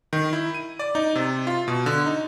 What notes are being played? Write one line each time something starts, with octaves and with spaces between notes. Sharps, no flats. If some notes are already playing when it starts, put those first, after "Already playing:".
D#3
E4
D#7
D5
D#4
C3
F4
B2
D3
D#4